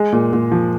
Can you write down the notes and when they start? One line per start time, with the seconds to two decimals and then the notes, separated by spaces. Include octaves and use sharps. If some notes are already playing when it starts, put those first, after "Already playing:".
Already playing: G#3
0.12 A#2
0.33 A#2
0.52 F3